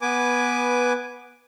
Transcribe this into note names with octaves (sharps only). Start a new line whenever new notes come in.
B3 B4 G#5 D6